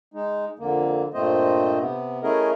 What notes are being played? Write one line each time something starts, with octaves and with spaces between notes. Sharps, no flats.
G#3 D#4
F2 D3 A#3
G2 A#2 A3 C4 C5 D#5
C3 B3
A3 C#4 E4 G#4 A#4 D#5